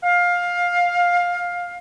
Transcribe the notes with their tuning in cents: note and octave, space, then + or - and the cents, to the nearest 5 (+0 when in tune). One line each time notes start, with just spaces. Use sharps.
F5 +15